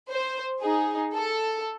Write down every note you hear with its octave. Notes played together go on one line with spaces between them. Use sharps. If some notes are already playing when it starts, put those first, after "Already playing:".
C5
D#4 G#4
A4